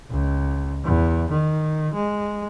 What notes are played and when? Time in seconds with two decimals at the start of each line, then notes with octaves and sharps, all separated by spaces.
0.11 C#2
0.84 E2
1.31 D#3
1.94 G#3